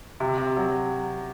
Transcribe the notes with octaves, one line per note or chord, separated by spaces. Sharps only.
C3
C3
F#3